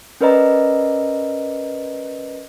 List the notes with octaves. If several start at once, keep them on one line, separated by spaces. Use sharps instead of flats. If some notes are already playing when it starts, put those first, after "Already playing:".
C#4 A#4 B4 D5 D#5 A#5